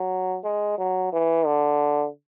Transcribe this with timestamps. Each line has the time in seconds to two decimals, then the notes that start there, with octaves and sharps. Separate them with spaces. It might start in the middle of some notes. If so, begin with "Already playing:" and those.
Already playing: F#3
0.44 G#3
0.78 F#3
1.12 E3
1.46 D3